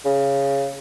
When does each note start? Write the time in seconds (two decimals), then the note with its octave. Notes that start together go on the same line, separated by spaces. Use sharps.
0.05 C#3